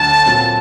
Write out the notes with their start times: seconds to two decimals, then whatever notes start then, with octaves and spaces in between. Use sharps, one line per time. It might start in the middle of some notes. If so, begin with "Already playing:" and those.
Already playing: D2 D3 F#3 A5
0.26 A#2 F#3 C4